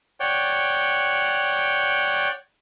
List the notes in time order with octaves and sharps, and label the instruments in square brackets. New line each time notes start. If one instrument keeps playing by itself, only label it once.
[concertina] C#5 D5 F#5 G5